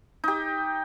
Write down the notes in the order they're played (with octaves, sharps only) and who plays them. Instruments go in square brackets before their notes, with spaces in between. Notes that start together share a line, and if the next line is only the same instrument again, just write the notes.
[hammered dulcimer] D#4 G4